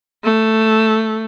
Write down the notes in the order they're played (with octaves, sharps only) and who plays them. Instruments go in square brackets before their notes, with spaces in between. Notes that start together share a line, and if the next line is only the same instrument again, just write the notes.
[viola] A3